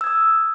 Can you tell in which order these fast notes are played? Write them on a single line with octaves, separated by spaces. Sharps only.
E6 G#6 D#6